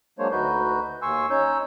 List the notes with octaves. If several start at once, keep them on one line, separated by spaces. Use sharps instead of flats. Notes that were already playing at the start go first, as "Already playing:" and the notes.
F#3 G#3 A#3 D4 C5 C#5
D2 D#4 F#4 B4 G6
D#2 G#5 C6 C#6 E6
C#4 D#4 C#5 E6 G6